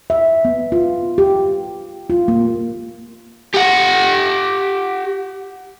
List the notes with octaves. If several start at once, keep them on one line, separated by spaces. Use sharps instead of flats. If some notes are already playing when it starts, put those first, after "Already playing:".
E5
B3
F4
G4
F4
A#3
G4 F#5